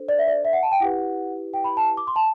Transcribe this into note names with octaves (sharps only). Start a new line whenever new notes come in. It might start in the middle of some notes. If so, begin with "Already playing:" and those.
Already playing: D4 A4 C5
D5
E5
D5
E5
F#5
A5
G5
E4 G4 B4 F#5
G5
B5
A5
D6
C6
A5